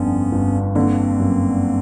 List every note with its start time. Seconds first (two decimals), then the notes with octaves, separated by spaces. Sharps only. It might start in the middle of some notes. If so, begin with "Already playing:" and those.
Already playing: G1 F2 D3 B3 C#4
0.32 G1
0.75 D3 A#3 C4
1.20 F#2